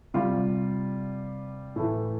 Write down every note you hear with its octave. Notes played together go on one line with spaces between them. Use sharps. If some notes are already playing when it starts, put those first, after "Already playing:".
C3 G3 F4
A2 E3 A3